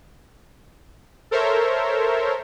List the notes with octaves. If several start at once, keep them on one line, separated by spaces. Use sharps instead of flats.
A4 A#4 C5 C#5 E5